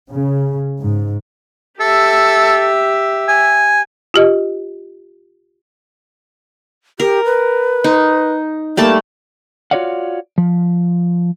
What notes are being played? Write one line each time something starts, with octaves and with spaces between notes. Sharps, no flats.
C#3
G#2
G4 A4 E5
G#5
F4 G4 D#5
G4 A#4
B4
D#4
G3 A3 A#3 A5
F4 F#4 C#5 D5 F5 F#5
F3